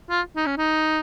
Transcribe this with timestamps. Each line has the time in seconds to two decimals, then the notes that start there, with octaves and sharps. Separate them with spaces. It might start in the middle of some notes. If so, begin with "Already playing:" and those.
0.10 F4
0.36 D#4
0.46 C#4
0.57 D#4